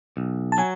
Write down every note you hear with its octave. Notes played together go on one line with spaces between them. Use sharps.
B1
A5
F#3 G#5